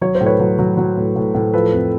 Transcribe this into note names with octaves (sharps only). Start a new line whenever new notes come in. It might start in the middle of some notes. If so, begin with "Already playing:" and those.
F#3 C#5
C5
A2
B4 C#5
F#3
F#3
F#3
A2
A2
A2
F3 A4 B4
F2